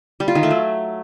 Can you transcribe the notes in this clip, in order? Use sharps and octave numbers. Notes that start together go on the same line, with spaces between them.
G3
F4
D#3
A3
F#3